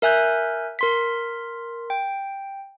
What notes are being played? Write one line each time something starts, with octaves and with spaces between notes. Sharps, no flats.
A#4 E5 G#5 F#6 G6
A#4 C6 B6
G5